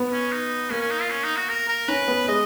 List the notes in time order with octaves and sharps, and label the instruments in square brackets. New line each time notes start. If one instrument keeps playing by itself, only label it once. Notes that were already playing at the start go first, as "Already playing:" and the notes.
Already playing: [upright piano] B3
[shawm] C#4
D#4
[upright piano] A#3 [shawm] C#4
[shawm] C#4
D#4
F4
C#4
D#4
F#4
A#4
A#4
[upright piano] C#4 [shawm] B4
[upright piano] B3
[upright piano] G#3 [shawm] D#5